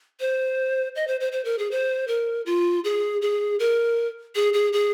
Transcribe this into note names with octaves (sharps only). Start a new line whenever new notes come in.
C5
D#5
C5
C5
C5
A#4
G#4
C5
A#4
F4
G#4
G#4
A#4
G#4
G#4
G#4